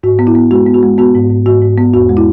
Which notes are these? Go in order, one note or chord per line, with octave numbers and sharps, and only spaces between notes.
G#2 F#4
B3
E4
B3
G#3 F#4
B3
F#4
G#3
B3 F#4
G#2
G#2
G#2 F#4
G#2
B3
E2 F#4
G#3
E4